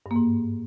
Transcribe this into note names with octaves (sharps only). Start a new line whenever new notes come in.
G2
A#3
G#2